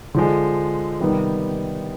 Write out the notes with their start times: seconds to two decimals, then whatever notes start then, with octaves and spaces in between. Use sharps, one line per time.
0.15 D3 F3 G#3
1.00 C3 D#3 G3 B3 D#4